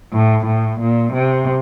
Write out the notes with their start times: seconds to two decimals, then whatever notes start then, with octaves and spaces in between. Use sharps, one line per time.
0.13 A2
0.46 A2
0.80 A#2
1.13 C3